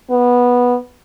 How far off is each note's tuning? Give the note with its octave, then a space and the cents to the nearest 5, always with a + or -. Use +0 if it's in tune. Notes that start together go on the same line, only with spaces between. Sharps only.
B3 -10